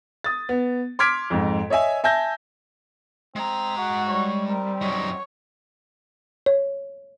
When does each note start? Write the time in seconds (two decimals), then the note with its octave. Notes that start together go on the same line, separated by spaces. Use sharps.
0.24 D#6 A6
0.49 B3
0.99 C6 D6 F6 G#6 B6 D7
1.30 F2 G#2
1.70 C#5 D#5 E5 G#5
2.04 E5 G#5 A5 G6 A#6
3.36 G#3 C4 A#5
3.77 F#4 F#5
4.10 G3 C#5
4.49 C4 A#4
4.81 F#2 D#4 C#5
6.46 C#5